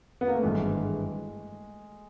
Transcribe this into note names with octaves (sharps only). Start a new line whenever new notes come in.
B3
A#3
A3
G#1 G2 E3 G#3